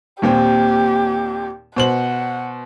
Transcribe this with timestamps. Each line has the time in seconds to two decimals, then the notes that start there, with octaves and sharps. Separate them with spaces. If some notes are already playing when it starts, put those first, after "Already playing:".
0.22 D#2 A#2 C4 G4
1.76 B2 C5 F#5 F#7